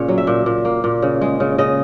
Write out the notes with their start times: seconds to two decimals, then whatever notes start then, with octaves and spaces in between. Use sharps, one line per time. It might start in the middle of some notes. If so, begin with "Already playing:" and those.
Already playing: A#2 C#3 C#4 C#5
0.08 F#3
0.18 E5
0.27 A#2
0.46 A#2
0.65 A#3
0.84 A#2
1.02 C#3
1.21 G#3
1.40 C#3
1.58 C#3 D#5